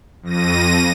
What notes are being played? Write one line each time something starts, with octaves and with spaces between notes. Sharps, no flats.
F2 A#6 D#7